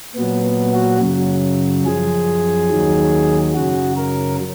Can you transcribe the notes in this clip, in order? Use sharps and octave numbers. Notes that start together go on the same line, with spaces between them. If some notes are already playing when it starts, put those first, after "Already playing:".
A#2 F#3 B3
B3
F#4
F#2 C#3 F#3
F#2 F3 G#4
D#2 D#3 F#3
F#2 C#3 F#3 F#4
A#4